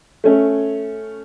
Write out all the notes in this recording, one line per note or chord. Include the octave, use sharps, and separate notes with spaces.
A3 C#4